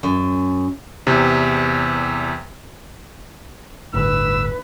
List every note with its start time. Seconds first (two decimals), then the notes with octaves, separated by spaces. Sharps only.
0.03 F#2
1.07 E2 C3
3.94 G1 D2 A2 B4 E6